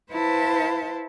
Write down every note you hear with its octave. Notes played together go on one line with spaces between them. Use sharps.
E4 B4 C5 F5 A5